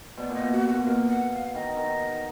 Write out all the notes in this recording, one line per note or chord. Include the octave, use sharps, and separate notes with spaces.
B2 D5
A#2 D#5
B2
F#4
F#4
A#2
B2 A#4
F#5
F5
D#3 D#5
D#3